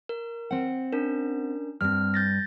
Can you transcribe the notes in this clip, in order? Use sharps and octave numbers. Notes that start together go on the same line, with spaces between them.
A#4
C4 F#5
C#4 D4 A#4
G2 C4 F6
G6 A6 A#6